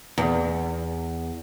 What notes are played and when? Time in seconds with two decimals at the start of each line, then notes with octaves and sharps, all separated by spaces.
0.18 E2